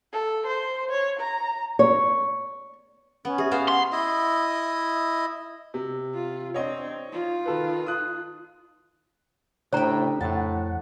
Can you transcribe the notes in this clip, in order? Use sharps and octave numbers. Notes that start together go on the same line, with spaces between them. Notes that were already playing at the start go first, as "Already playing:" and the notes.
A4
C5
C#5
A#5
C#5
B3 C#4
G4 G#4 E5
B3 C5 F5
F#5 C6
E4 D#5
C3
F4
C4 D4 C#5 D#5
D#4 F4
D#3 A4 B4
D#6 F#6
A2 C#3 D4 G4 C5 D#5 G5 A#5
F2 A2 F#5 A5